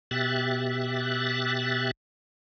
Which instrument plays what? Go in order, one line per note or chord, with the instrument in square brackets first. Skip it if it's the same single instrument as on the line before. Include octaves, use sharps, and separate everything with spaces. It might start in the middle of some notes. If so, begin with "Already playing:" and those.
[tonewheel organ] B2 G4 E5 F#6 A6